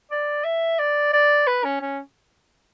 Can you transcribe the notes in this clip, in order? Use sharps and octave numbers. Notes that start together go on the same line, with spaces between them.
D5
E5
D5
D5
B4
C#4
C#4